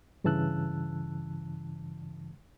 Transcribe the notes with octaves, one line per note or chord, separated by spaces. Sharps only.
G2 C#3 E3 A5 E6 F#6